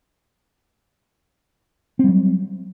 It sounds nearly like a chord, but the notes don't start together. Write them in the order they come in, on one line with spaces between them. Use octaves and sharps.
C4 G3 F#3